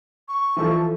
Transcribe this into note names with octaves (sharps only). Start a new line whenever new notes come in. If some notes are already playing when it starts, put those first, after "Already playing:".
C#6
E3 F3 A4